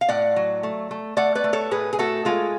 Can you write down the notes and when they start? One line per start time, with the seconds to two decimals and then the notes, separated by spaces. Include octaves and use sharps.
0.01 F5
0.09 A2 D5 F#5
0.36 F#3
0.63 A3
0.91 A3
1.17 A3 D5 F#5
1.35 B4 D5
1.44 A3
1.53 A4 C#5
1.71 A2 G#4 B4
1.93 G#4
1.99 A3 F#4 A4
2.25 G#3 F4 G#4